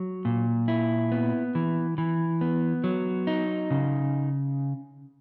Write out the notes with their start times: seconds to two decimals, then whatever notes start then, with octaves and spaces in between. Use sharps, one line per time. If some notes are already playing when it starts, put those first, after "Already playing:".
Already playing: F#3
0.25 A#2
0.68 E4
1.12 B3
1.55 E3
1.98 E3
2.41 B3
2.84 F#3
3.27 D#4
3.71 C#3